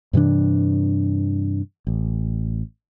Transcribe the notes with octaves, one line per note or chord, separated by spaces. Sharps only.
G2 C3 E3 D4
A1